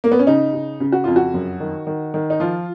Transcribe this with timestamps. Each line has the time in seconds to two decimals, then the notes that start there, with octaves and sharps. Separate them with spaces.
0.04 A#3
0.12 B3
0.19 C#4
0.27 C#3 D#4
0.53 C#3
0.80 C#3
0.92 F#4
1.04 F2 F4
1.16 F#4
1.34 F#2
1.60 D#3
1.87 D#3
2.14 D#3
2.30 D#4
2.40 F3 F4